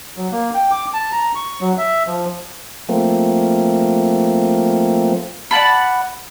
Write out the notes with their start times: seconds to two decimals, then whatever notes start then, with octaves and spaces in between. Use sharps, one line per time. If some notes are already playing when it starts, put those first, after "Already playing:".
0.17 F#3
0.32 A#3
0.54 G5
0.71 D6
0.94 A5
1.12 A#5
1.35 C#6
1.61 F#3
1.78 E5
2.07 F3
2.89 F3 A3 A#3 C4
5.51 D5 F#5 A5 B5